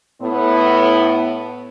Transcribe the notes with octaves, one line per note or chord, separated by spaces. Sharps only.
A2 B3